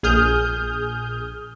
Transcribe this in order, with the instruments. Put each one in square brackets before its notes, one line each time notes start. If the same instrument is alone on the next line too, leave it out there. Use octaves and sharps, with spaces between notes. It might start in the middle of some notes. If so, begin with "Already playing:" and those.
[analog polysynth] A#1 G#4 D#6 F6 G6